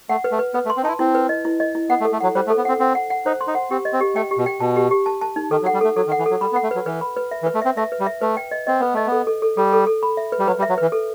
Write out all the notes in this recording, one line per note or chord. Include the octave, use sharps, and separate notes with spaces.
A3 F#5
B4
A3
B4
B3 B4
A3
C6
C4
D#4 E4 A5
C4 E4
B4
D#5
E4
D#5
E4
B3 F#5
A3
A4
A3
F#3 F#5
G3 C5
A3
A4
B3
C4 F#5
C4 F#5
F#5
F#5
D#4 C5
C6
D#4
F#5
C4 G4
D#5
C4
G4
A3 G5
G4
B2
G5
B2 A5
G4
G4
A5
A5
D#4
D#3 A4
F#3
F#5
G3
A3 A4
F#3 A4
D#3
F#5
E3
F#3 A4
G3 B5
B3
F#5
A3
F#3 B4
E3 B4
B5
B4
E5
E3
B4
A3
C4 E5
A3 E5
B4
G3
E5
A3 B4
G5
D#5
C4 D#5
B3 B4
A3 D#5
B3 A4
A4
A4
G3 A4
A4
A4
B5
E5
B4
G3
F#3 B4
G3
E5
F#3
E3 B4
A4